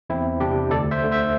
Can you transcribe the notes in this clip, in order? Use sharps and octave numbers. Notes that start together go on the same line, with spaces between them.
E2 C4 E4
C3 G3 D4 G4
D2 A4 D5
C5 E5
D3 A3
C5 E5